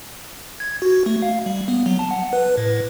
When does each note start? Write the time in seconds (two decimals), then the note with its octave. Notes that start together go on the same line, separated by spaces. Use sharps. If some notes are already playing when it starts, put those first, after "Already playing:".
0.60 G#6
0.82 F#4
1.06 A3
1.22 F5
1.46 G3
1.68 B3
1.86 F#3
1.99 A5
2.11 F#5
2.33 B4
2.57 A2